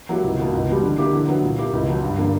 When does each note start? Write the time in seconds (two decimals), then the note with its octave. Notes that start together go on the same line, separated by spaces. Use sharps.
0.09 F#3 A#3 E4 G4
0.24 C#2
0.39 B2 A#3 E4
0.53 C#2
0.68 B2 G3
0.83 D3
0.98 A#3 E4 G4
1.13 D3
1.28 F#3 B3 E4
1.43 A#2
1.58 A#3 E4 G4
1.73 C#2
1.88 B2 F#3
2.03 G2
2.18 D3 A#3